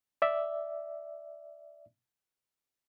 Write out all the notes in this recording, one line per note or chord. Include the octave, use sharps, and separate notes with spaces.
D5 E5